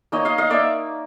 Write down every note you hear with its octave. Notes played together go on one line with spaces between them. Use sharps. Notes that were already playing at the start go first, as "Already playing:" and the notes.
A#3 D#4 C#5 D#5
D#5 F5
D#5 F5
A#3 D#4 D5 E5